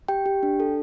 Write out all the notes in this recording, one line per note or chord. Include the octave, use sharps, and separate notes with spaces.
G4 G5
G4
D4
A4